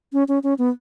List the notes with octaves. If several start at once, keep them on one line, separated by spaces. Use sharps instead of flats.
C#4
C#4
C#4
B3